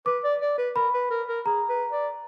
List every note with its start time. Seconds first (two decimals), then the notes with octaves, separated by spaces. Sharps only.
0.06 B4 D6
0.24 D5
0.41 D5
0.58 B4
0.76 A#4 B5
0.94 B4
1.11 A#4
1.28 A#4
1.46 G#4 A#5
1.69 B4
1.92 D5